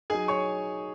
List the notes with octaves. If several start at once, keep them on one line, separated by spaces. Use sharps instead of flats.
F#3 D#4 G#4 G#5
C#5 C#6